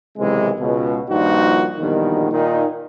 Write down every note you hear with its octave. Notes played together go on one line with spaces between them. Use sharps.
B1 C3 D#3 E3 G#3
C#2 B2
G2 A#2 D#3 F3 D#4 F#4
A#1 E2 G2 B2 D#3
A#2 D#3 D#4